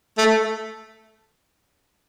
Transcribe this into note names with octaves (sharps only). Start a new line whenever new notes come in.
A3